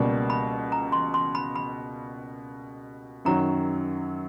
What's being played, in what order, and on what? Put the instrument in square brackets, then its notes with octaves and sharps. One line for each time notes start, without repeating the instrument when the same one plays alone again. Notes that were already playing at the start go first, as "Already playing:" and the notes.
Already playing: [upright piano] C#2 B2 G3 A#3
[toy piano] B5
A#5
C6
C6
B5
B5
[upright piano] F#2 D#3 F#3 [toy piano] A#5